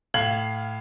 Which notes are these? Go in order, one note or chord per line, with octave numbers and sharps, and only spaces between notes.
A2 F5 G#6 F#7